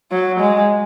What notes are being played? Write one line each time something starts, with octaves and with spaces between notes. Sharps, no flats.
F#3
G#3